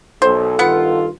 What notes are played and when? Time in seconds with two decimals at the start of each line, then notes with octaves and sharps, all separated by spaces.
0.22 B1 A4 C5
0.59 G2 D#3 B3 F4 F#5